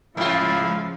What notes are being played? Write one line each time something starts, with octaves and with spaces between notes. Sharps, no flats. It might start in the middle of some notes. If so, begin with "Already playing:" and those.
G#2 C#3 F3 G#3 E4 F4 F5